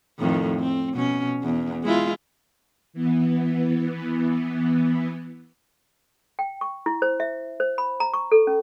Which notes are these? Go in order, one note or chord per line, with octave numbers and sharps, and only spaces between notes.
F2 A2 D#3
C4
B2 C#4
E2
G#3 E4 F4
E3 B3
G5
C#6
E4
C5
E5
C5
B5
A#5
C#6
A4
C#4